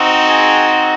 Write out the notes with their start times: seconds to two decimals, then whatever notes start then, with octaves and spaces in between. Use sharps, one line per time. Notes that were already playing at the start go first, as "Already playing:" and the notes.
Already playing: C4 D#4 F#4
0.28 G#4